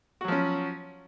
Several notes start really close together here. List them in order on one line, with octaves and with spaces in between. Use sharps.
F#4 F#3 F3 C#4